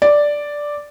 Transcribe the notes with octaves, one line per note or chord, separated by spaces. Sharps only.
D5